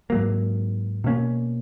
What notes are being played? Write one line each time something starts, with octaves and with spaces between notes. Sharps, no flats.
G#2 F#3 A#3
B2 A#3 C#4